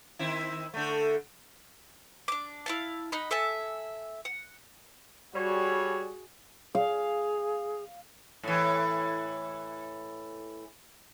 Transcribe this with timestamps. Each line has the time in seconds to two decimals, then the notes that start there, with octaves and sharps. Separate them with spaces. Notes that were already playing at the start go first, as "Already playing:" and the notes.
0.19 D#3 C4 E4
0.74 D3 A3
2.28 D4 D6
2.66 E4 F5 A5
3.12 D#4 D#5 F#5 B5
3.31 A4 E5 G#5 A5
4.25 F#5
5.34 G3 F#4 G#4 C#5
6.75 G#4 F5
8.43 A2 E3